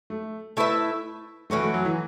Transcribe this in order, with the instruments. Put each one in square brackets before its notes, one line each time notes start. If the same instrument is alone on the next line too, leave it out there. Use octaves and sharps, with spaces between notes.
[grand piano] A3
[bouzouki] A3 E4 B4 E5
[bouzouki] E3 C#4 F#4 B4 [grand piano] A3
[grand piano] A3
F#3
E3